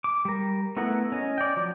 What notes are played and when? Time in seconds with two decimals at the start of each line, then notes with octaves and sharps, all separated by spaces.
0.04 D6
0.25 G3 A#4
0.77 A3 B3 E4 A#4 F#5
1.12 C#4 D#5
1.38 D5 G5
1.57 F3 F#3 D6